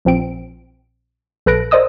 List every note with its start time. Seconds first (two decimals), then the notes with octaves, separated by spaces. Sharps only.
0.05 A#1 F3 C4 D7
1.46 A#1 A4 B4 F#6 A#6 D7
1.71 A#4 C5 D5 D#5 D#6 E6